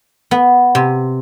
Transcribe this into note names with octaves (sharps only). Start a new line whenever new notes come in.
B3
C3